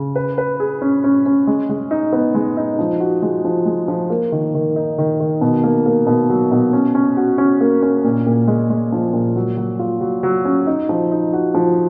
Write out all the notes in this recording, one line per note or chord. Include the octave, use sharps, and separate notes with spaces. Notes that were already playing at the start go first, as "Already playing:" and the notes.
Already playing: C#3
B4
B4
G#4
C#4
C#4
C#4
G#3
G#3
D#4
B3
G#3
D#4
F3
F#4
G#3
F3
G#3
F3
A#3
D#3
D#3
D#4
D#3
D#3
B2
A#3
A#3
B2
F#3
B2
C#4
C#4
F#4
C#4
A#3
C#4
A#2
A#2
G#3
G#3
F3
A#2
F#3
F#3
F4
F#3
F#3
C#4
D#4
F3
D#4
F#4
F3